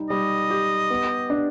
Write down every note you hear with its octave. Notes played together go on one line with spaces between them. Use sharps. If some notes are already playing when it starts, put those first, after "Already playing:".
Already playing: G3 D#4
G3 D#5
G4
B3
D4